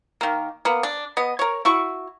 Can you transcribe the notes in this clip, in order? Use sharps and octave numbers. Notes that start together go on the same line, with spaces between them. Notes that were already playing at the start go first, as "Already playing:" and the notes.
D#3 A#3
A#3 B3
D4
B3 D#5
A#4 C#5
E4 F#4 C#6